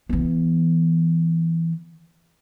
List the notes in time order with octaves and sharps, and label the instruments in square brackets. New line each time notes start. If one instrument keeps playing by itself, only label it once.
[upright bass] E3 B3